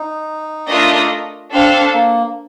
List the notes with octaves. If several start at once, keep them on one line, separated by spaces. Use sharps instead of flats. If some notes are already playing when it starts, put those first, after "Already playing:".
Already playing: D#4
A3 D4 F4 A#4 D#5
C4 D4 A4 C5 F5 A5
A#3